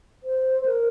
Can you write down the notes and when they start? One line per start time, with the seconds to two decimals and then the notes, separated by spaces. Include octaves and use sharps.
0.23 C5
0.66 A#4